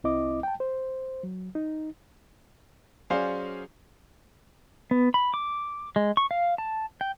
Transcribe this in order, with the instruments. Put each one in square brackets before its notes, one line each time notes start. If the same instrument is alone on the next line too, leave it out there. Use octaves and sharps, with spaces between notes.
[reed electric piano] C2 C4 E4 D#5 D6
G5 A5
C5
F#3
D#4
[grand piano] F#3 C#4 G#4 C5 D5 F5
[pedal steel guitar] B3
B5
D6
G#3
C#6
F5
A5
G5